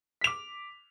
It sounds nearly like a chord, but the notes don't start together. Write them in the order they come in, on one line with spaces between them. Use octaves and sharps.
B6 F7 D6